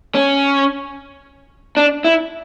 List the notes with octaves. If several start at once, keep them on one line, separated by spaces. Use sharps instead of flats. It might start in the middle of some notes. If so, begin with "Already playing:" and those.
C#4
D4
E4